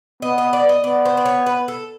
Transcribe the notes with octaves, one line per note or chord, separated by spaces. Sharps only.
B3 D#5
D#5
D5
D#5
B3 D5
C5
D5
C#5
B4
A4